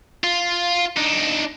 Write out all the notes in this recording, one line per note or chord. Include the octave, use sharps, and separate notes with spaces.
F4
D4 D#4